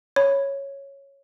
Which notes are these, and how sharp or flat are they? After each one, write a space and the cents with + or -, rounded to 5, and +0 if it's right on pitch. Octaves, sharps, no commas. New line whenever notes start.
C#5 -5 B5 +0